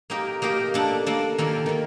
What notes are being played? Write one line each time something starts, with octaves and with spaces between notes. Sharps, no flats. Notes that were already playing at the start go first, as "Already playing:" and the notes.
A#3 D#4 G4 A#4
A#3 D#4 G4 A#4
A#3 D4 A4
A#3 D4 A4
D#3 A#3 F4 A4 D5
D#3 A#3